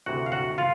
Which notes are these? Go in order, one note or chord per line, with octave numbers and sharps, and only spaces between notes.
D2 C3 E3 F#4 F#5
F5
F#4 F#5
F4 F5